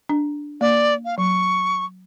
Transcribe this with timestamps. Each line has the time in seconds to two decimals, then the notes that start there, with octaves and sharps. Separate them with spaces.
0.09 D4
0.61 A#3 D5
1.05 F5
1.18 F#3 C#6